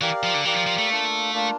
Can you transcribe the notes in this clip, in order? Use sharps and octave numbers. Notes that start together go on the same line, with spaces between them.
E3 G4 A#4 D5 F5
F3
D3
E3 G4 A#4 D5 F5
F3
F3
A3
A#3 D4 F4
A#3 D4 F4